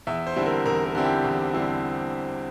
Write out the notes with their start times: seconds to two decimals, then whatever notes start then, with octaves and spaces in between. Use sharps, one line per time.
0.07 E2 E5
0.27 C5
0.36 D3 G3 C4 E4
0.46 A#4
0.65 E2 A#4
0.85 A#4
0.95 D3 G3 C4 E4
1.04 G4
1.24 E2
1.53 D3 G3 C4 E4